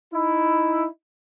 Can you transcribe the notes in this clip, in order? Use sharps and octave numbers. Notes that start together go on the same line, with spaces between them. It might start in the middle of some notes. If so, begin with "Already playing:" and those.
D#4 E4